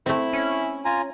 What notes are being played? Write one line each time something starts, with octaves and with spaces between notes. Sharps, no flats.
A3 C4 E4
C#4
F4 G#5 A#5